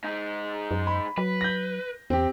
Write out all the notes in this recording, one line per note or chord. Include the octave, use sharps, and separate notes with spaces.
G#2 D#4
F#2
B5
F#3 B4
G6 A#6
E2 C4 G4